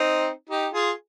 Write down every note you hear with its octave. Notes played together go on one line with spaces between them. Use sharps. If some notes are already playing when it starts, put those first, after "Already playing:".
Already playing: C4 D#4
D#4 G4
F4 G#4